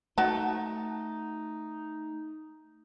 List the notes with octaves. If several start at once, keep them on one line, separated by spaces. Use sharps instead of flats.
A3 D#4 F#4 A5